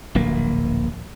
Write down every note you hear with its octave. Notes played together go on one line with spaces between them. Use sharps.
D1 A#1 A#3